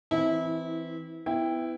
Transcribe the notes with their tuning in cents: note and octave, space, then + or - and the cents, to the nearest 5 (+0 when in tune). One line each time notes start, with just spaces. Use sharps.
E3 +0 C4 -10 E4 -25
B3 +25 E4 +0 G5 +10